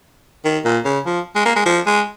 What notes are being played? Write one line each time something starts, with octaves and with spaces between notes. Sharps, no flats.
D#3
A#2
C#3
F3
G#3
A#3
G#3
F3
G#3